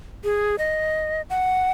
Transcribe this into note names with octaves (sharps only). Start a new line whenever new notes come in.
G#4
D#5
F#5